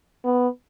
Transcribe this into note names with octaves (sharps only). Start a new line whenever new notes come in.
B3